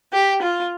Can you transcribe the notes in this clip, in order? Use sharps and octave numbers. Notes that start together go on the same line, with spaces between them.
G4
F4